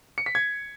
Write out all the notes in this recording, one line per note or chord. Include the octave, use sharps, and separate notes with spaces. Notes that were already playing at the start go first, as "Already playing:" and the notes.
C#7
B6
G#6